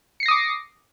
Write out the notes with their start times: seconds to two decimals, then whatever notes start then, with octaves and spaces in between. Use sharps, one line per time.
0.20 C#7
0.23 C7
0.26 A#6
0.28 D#6
0.31 D6